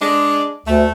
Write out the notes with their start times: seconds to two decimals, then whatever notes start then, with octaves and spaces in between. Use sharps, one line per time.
0.01 G#3 D4
0.66 D2 A3